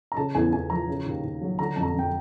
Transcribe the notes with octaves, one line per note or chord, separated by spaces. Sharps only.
A#5
C#3 A5
E2 G#5
E2 G#5
F3 A#5
C#3
D#2
D#2
F#3
D3 A#5
F2 A5
A#5
F2 G5